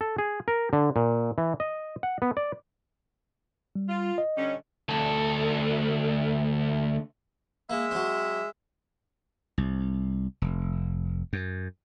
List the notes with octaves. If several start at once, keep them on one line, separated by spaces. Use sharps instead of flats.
A4
G#4
A#4
D3
A#2
E3
D#5
F#5
B3
D5
G3
F4
D#5
D3 G3 C#4
D2 A4
G#3 A#3 E5
F#3 C4
C2
F1
F#2